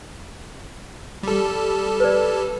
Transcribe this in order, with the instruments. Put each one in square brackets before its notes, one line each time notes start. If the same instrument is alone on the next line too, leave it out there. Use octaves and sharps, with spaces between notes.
[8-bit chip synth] G3 A4
[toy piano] B4 D5